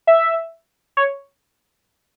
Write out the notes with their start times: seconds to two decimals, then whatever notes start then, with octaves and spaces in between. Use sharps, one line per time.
0.07 E5
0.97 C#5